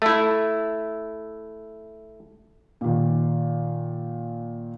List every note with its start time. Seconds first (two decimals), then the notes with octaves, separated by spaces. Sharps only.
0.02 A3 E4
2.81 A#2 D#3